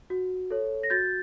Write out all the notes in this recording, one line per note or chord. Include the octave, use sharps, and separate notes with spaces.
F#4
A4 C#5
A#6
F#4 G6 A6